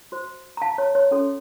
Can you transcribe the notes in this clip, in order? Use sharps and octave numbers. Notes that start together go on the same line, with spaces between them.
F#4 C5
A#5
F5 A5
C#5
C#5
C#4 F#4 A4 C#5